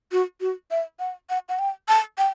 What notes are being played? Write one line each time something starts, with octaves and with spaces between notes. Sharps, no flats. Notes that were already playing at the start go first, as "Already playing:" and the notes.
F#4
F#4
E5
F#5
F#5
F#5
G5
A5
G5